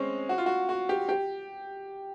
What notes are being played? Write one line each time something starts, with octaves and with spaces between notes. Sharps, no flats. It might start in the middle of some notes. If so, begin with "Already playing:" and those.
Already playing: G#3 C4 C#4
F#4
F4
F#4
F#4
G4
G4